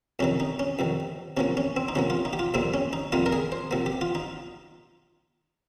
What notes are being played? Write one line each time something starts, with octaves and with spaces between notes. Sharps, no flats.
F2 C3 D#3 C#4
D#4
C#4
F2 C3 D#3
C3 F3 A#3 C#4
C#4
C4
D#4
C3 F3 A#3 C#4
F4
D#4
G4
F4
F2 C3 G3 A#3 C4
C#4
D#4
F2 C3 G3 A#3 F4
A#4
G#4
C5
C3 F3 A#3
G4
F4
D#4